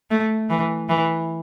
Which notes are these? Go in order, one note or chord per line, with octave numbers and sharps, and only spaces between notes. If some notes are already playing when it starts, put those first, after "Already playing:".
A3
E3
E3